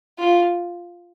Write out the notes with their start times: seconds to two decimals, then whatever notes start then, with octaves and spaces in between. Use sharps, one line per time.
0.19 F4